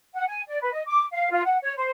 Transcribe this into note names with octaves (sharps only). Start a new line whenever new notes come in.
F#5
G#5
D5
B4
D#5
D6
F5
F4
F#5
C#5
C5